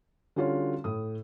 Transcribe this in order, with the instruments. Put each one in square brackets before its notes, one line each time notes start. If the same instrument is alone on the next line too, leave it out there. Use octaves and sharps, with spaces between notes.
[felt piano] D3 G3 C#4 F4 F#4 C#5
A2 D#6